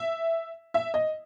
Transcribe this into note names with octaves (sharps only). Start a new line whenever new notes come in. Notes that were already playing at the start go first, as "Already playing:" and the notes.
Already playing: E5
E5
D#5